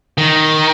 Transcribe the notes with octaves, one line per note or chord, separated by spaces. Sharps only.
D#3